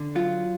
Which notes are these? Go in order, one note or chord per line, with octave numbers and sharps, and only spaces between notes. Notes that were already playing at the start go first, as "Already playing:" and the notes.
Already playing: D3
F#3 F4